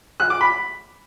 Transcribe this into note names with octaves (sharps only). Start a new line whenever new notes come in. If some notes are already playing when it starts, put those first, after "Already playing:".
F#6
D6
B5